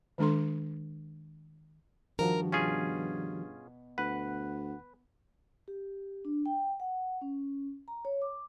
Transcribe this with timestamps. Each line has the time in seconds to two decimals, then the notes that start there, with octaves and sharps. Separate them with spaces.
0.18 D#3 G#3 D4 A4 C6
2.19 G2 D#3 F3 F#4 A#4
2.52 B2 C#4 F4 G#4
3.98 D2 B4 F#5 F#6
5.68 G4
6.25 D4
6.46 G5
6.80 F#5
7.21 C#4
7.88 A#5
8.05 C#5
8.22 D6